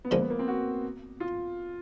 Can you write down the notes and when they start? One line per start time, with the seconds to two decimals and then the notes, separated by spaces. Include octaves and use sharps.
0.05 B3
0.11 D3 F3 G#3 A#3
0.21 B3
0.30 A#3
0.39 C4
0.48 F#4
1.20 F4